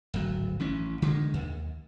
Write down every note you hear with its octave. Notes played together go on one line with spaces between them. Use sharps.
D1 G#1 F#3
A1 E3 C#4
D3 D#3 G3 G#3
D#2